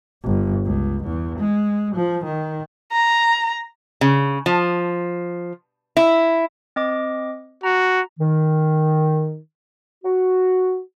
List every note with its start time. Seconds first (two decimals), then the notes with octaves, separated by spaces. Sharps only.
0.23 G1
0.65 C#2
1.04 E2
1.39 G#3
1.95 F3
2.24 D#3
2.92 A#5
4.01 C#3
4.46 F3
5.97 E4
6.76 C4 D#5 D6
7.63 F#4 A#5
8.19 D#3
10.04 F#4